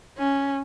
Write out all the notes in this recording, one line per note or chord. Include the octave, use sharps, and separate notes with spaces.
C#4